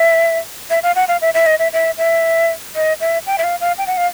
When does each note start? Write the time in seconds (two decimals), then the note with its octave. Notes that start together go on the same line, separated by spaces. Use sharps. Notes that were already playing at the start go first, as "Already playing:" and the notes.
Already playing: E5
0.70 E5
0.83 F5
0.96 F#5
1.08 F5
1.21 E5
1.34 E5
1.46 D#5
1.59 E5
1.73 E5
1.98 E5
2.76 D#5
3.01 E5
3.27 G5
3.38 E5
3.44 F5
3.61 F5
3.78 G5
3.87 F#5
3.97 F5